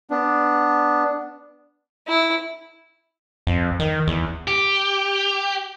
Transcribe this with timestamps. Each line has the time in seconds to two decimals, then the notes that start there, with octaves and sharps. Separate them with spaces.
0.10 B3 D4
2.08 E4
3.47 F2
3.80 D#3
4.07 E2
4.48 G4